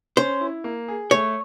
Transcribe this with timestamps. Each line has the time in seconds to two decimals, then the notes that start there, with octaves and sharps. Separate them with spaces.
0.17 C#4 C5
0.41 E4
0.64 A#3
0.88 G#4
1.11 A3 C#5